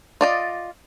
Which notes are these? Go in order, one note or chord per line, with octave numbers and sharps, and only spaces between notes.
F4 D5 D#5